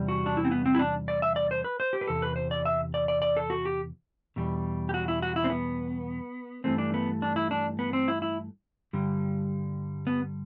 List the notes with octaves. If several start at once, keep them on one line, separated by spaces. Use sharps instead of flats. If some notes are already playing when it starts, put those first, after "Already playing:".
Already playing: E2 C3 G3
F#4
D4
E4
C4
B3
C4
E4
D4
D5
E5
D5
C5
B4
C5
G4
B4
E2 C3 A4
B4
C5
D5
E5
D5
D5
D5
A4
F#4
G4
E2 B2 G3
G4
F#4
E4
F#4
E4
C4
B3
G2 E3 A3 C4
D4
B3
D4
E4
D4
B3
C4
E4
E4
G2 D3 G3
B3